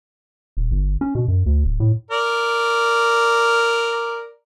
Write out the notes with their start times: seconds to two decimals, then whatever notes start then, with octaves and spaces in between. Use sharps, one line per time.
0.57 D#1
0.71 G1
1.01 C#4
1.15 B2
1.28 F#2
1.46 D2
1.65 D1
1.80 A2
2.11 A#4 D5